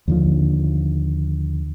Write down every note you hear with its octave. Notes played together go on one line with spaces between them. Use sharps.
D#2 D3 F3